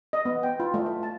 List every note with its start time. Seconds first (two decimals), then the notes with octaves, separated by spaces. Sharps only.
0.13 D#5
0.25 B3
0.43 G5
0.60 F4
0.74 A3
0.86 E5
1.03 A5